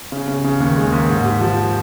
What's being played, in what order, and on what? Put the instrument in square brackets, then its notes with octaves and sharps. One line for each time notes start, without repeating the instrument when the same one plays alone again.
[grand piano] C#3
C#3
C#3
D#2
G#3
D#2
G#2
G4
F3